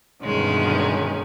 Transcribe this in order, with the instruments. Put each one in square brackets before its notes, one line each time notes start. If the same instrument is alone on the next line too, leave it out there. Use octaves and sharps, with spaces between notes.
[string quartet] D2 G2 B2 D#3 G#3 C#4